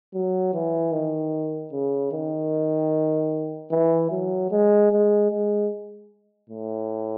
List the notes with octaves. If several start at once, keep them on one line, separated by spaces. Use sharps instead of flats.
F#3
E3
D#3
C#3
D#3
E3
F#3
G#3
G#3
G#3
A2